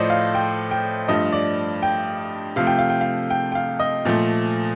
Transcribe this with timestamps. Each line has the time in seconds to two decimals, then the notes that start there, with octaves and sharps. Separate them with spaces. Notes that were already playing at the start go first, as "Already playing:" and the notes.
Already playing: A2 F3 A3 C5 D5 D#5
0.10 F5
0.35 G5
0.71 G5
1.08 G2 F3 A3 D#5
1.32 D5
1.83 G5
2.56 C3 F3 A3 F5
2.67 G5
2.79 F5
2.90 G5
3.01 F5
3.30 G5
3.52 G5
3.55 F5
3.80 D#5
4.05 A#2 F3 A3